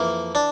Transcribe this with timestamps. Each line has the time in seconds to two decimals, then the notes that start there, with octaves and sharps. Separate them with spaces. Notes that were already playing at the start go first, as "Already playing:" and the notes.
Already playing: F2 E3 A#3
0.35 D4